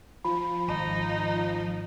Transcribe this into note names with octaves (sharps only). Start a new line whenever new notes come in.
F3 B5
G#1 D#4